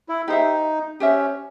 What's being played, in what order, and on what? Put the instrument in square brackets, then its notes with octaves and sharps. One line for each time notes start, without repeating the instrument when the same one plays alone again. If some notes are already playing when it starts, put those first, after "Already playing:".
[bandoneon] E4
[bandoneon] D#4 [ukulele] G4 C5 E5
[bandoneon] C#4 [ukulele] G4 C5 E5